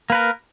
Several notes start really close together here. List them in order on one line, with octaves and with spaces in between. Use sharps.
A#3 B4 A#4